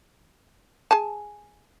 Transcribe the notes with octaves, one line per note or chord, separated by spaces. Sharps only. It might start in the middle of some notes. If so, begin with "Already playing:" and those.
G#4 G#5 A5